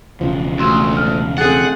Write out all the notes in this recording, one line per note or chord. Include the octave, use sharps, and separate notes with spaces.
E1 C#3 F3
D2 F#4 C6 E6
F6
C4 G#4 A4 F#5 F#6 A6